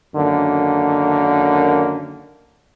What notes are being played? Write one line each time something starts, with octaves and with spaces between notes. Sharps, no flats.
F#2 D3 D#3 A#3